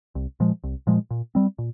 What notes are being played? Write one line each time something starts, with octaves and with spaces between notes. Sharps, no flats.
C2
A#2 F3 G#3
C2
A#2 F3 G#3
A#2
G3 C4
A#2